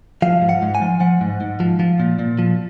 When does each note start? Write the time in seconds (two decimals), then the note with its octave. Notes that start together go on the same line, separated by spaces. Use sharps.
0.22 F3 F5
0.42 G#2
0.49 F#5
0.62 G#2
0.75 G#5
0.82 F3
1.00 F3 F#5
1.21 G#2
1.41 G#2
1.60 F3
1.80 F3
2.00 A#2
2.19 A#2
2.39 F3